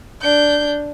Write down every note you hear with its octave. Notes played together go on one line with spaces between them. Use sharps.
D4 G6